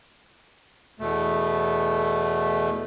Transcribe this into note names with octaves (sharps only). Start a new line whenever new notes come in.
E2 B2 A3